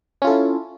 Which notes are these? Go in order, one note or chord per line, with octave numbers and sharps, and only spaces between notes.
C#4 E4 F4 A4